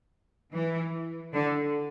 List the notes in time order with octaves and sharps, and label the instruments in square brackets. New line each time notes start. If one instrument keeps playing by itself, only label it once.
[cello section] E3
D3